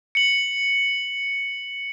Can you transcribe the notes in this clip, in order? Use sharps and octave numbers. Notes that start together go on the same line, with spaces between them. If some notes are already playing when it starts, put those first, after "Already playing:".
C#7 F#7